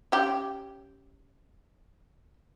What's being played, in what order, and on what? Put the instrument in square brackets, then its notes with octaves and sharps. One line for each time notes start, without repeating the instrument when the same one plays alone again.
[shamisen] C#4 G4